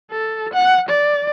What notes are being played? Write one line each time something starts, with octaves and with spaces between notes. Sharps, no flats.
A4
F#5
D5